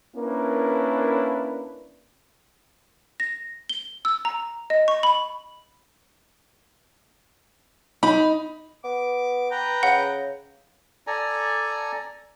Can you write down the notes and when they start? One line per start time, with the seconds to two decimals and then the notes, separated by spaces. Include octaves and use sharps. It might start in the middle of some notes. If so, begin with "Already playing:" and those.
0.16 A#3 C#4 D4 E4 A#4 B4
3.20 A#6
3.69 G7
4.05 E6
4.25 A#5
4.70 D#5
4.88 C#6
5.03 B5
8.03 D#4 B5
8.84 B3 D6
9.51 B4 G5 A#5
9.83 C#3 F#5
11.07 A4 D5 G#5 A#5